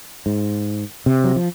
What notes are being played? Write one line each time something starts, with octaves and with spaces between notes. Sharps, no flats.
G#2
C3
F#3
F3